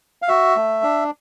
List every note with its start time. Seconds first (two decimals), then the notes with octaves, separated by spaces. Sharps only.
0.22 F5
0.28 F#4 E5
0.56 A3
0.83 D4